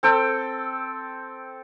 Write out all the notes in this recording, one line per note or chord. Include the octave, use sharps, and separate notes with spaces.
C4 A4 G5